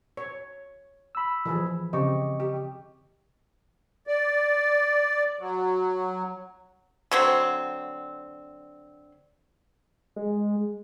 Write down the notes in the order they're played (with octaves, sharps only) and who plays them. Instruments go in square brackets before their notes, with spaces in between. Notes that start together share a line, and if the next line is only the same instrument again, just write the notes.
[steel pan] C#5
[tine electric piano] B5 E6
[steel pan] E3 F3 G#4
[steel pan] C#3 C4 G4 [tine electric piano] D#5 C#6 D6
[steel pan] G4
[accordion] D5
F#3
[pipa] D3 F#3 C4
[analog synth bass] G#3